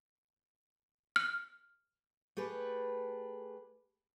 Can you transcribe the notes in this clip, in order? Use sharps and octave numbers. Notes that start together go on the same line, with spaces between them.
F6
A3 G4 G#4 B4